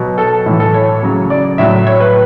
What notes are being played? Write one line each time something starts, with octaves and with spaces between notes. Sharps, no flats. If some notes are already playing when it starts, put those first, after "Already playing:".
Already playing: B2 F#3
A4
A2 E3
A4
C#5
C#3 F#3
D5
A2 F#3 E5
C#5
B4